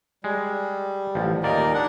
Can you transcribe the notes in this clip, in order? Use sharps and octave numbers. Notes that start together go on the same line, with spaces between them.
G3 G#3
A1 F3
D#2 A#2 A#3 D#4 A#4 D5
D4 F#5